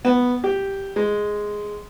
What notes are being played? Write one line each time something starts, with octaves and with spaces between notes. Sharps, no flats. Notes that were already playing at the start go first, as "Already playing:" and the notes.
B3
G4
G#3